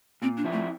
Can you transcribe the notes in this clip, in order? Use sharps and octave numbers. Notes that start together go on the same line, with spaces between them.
A#2 C4
D4
F3 C4 E4
A3